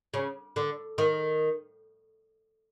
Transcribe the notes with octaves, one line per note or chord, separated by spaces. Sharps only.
C#3
D3
D#3